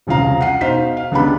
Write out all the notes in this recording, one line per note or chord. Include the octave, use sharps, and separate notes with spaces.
E1 C2 C#3 F3 F5 A#5
F#5 C7
B2 D#4 C5 F5 B6
F5
C#2 C#3 B3 D4 G4 B5